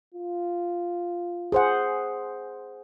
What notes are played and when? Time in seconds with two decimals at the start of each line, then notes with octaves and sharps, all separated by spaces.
0.14 F4
1.52 G#4 C5 F#5